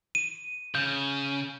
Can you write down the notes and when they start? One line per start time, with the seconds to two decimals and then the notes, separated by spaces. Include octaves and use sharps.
0.15 D#7
0.75 C#3 G6